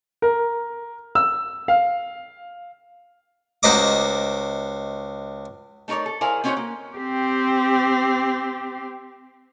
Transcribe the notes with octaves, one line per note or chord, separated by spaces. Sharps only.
A#4
E6
F5
C#2 F#4 C5 D#5 A#5 D6
A3 D#4 A#4 C#5 D5
A4
E4 G#4 A#4 C5 D5 F5
C4 C#4 D#4 F#4 C5 C#5
A#3
C4 G4